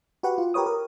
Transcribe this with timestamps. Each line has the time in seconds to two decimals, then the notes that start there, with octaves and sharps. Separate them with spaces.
0.23 F#4 G4 B4 F#5
0.38 F4
0.54 G4 A#4 B4 C#5 D#6
0.66 A#4